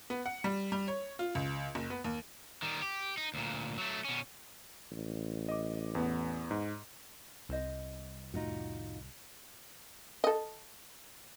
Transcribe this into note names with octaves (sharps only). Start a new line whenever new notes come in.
B3
F#5
G3
G3
C#5
F4
C#2
F#1
B3
D#2
D#3 G3
G4
D#4
D2 A#2
F#3 A3
B2 C#4
A1
D#5 D6
E2 B3
G#2
C2 E4 C5 D#5
F2 A2 D#3 D#4 F4 F#4
A4 D#5